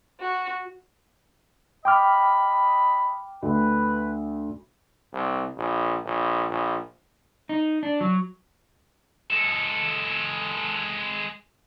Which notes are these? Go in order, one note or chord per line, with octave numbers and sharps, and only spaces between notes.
F#4
D#5 G5 B5 D6 F6
D2 B4
C2
A#1
A#1
A#1
D#4
D4
F#3
G#3 A4